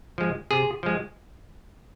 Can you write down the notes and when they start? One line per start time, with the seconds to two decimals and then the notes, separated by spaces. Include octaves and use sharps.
0.18 F3 G#3
0.51 C3 G#4
0.83 F3 G#3